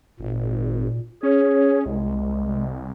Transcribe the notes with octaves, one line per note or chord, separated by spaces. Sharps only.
G#1 A#2
C#4 G#4 C#5
C2 G#3